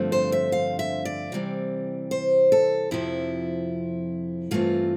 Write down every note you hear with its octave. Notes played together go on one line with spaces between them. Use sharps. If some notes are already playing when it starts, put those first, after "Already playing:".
Already playing: G2 D3 F3 A3 C4
C5
E5
F5
E5
D5
C3 E3 G3 C4
C5
A4
F2 C3 F3 E4
G2 E3 A3 C4 F4